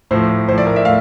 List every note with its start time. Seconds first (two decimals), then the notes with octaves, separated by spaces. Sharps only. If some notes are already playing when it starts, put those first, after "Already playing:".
0.11 A2 F3 C5
0.48 A2 F3 C5
0.58 D5
0.67 A#4
0.76 E5
0.85 A2 F5